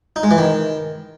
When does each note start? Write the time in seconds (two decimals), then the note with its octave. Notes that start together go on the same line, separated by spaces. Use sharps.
0.16 D#4
0.23 G#3
0.31 E3
0.38 D#3